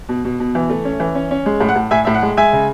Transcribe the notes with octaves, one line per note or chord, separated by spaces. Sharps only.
B2
B2
B2
E3
A3
C#4
E3
C#4
C#4
G#3
A2
F#5
A2
A2 E5 G#5
A2 E5
F#5
G#3
G#3 E5 G#5
C#3